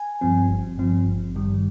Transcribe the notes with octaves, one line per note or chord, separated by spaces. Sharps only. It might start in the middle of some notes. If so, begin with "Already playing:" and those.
Already playing: G#5
G2 F3 C4
G1
G2 F3 C4
G#1
G2 D#3 G3